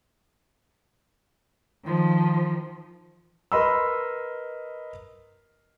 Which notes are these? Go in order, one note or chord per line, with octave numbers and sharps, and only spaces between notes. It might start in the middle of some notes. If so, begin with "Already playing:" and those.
D#3 F3
A#4 B4 D#5 B5 C6 E6